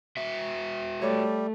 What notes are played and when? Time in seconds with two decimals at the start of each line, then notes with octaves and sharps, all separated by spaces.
0.17 F#4 B4 E5
1.02 G3 A3 C#5 D5